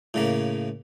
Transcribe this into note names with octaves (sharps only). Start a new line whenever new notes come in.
A2 C#3 A#3